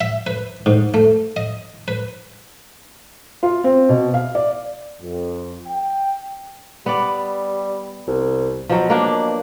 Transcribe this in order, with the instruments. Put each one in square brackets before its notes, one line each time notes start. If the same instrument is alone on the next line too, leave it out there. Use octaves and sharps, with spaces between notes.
[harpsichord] E5
B4
G#2
A3
D#5
B4
[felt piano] F4
C4
B2
F5
D5
[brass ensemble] F2
G5
[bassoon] G3 [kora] B3 D5
[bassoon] C2
[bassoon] B2 [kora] F3 F#3
[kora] A#3 D4